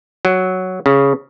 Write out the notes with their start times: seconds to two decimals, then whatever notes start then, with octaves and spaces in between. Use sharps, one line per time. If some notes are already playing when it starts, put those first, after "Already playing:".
0.25 F#3
0.86 C#3